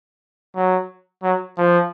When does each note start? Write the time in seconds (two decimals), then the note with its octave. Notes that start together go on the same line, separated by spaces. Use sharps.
0.56 F#3
1.23 F#3
1.58 F3